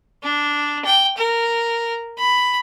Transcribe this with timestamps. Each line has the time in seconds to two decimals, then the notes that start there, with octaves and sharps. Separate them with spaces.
0.23 D4
0.85 G5
1.17 A#4
2.18 B5